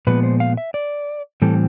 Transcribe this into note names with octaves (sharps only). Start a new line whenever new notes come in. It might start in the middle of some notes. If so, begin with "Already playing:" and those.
A#2 F3 G#3 B3 B4
C5
F5
E5
D5
A2 E3 G3 C4 A4